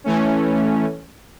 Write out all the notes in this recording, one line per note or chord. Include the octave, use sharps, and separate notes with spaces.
E3 A3 C#4